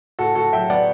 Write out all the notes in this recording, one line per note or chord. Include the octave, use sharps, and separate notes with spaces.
A2 F#4 A4
A2 F#4 A4
F#3 E5 G5
B3 D5 F#5